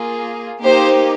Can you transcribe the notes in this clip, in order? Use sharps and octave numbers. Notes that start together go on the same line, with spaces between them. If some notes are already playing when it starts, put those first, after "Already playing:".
Already playing: A#3 F4 G#4
A#3 D#4 G4 C5